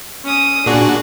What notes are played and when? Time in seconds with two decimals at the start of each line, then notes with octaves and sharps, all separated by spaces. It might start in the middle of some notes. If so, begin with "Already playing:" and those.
0.24 C#4 D#6
0.66 A#2 D4 F#4 G#4